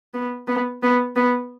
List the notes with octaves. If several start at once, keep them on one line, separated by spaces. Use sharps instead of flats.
B3
B3
B3
B3